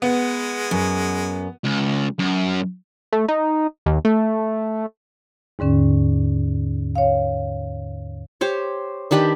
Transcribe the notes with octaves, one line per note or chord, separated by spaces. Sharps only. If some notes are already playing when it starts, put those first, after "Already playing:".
G#3 B3
F#2
C#2
F#2
A3
D#4
D#2
A3
D#2 G#2 D3 C#4
C#5 F5
G4 C5 C#5
D#3 D4 G4 B4